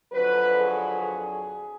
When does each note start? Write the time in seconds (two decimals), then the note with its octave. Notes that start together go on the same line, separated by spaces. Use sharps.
0.12 F2 D3 F#3 B4
0.57 G#4